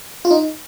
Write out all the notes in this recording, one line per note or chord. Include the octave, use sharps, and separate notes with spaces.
F4
D#4